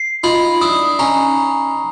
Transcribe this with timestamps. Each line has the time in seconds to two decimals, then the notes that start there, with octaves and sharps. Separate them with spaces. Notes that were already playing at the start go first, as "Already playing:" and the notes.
Already playing: C7
0.24 D#4 F4 B5
0.61 D4 E4 D#6
0.99 C#4 D#4 A#5